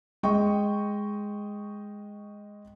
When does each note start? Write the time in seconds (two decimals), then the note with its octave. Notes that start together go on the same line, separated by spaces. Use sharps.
0.23 G#3 D#5 G5 C#6